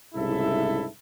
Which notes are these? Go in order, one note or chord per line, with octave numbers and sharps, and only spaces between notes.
C2 G#2 C#3 E4 A4 E5